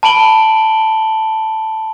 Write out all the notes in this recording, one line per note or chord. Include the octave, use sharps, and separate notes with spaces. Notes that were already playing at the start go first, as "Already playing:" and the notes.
A5 B5 D7 F#7 G7